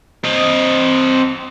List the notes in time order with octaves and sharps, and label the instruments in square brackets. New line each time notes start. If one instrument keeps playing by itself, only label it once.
[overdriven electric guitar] C4 D#5